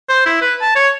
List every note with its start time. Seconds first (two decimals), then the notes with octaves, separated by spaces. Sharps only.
0.09 C5
0.26 E4
0.42 B4
0.61 A5
0.76 C#5